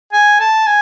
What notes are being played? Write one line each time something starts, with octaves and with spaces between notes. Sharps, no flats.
G#5
A5
G#5